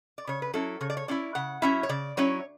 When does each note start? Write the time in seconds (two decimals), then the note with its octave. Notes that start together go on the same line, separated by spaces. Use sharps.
0.18 D5
0.27 C#3 C#5
0.42 B4
0.53 F#3 C#4 E4 A4
0.81 C#3 C#5
0.90 D5
0.97 C#5
1.08 F#3 C#4 E4 D5
1.35 C#3 F#5
1.62 F#3 C#4 E4 E5
1.83 C#5
1.89 C#3 D5
2.17 F#3 C#4 E4 C#5